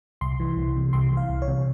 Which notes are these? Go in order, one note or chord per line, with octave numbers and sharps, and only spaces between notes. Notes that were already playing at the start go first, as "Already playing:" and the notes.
C2 C6
E3
C2
C3
C2 C6
E3
F5
C2
C#5
C3